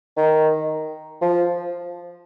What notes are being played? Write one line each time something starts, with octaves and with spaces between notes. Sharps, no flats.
D#3
F3